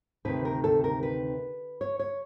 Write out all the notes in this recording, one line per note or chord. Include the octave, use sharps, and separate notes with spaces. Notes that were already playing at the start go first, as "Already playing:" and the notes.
D2 C3 D#3 B4
A#4
A4
A#4
B4
C#5
C#5